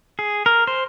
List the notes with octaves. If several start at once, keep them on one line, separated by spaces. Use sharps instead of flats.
G#4
A#4
C5